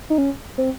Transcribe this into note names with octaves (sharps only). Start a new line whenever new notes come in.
D#4
C#4
C4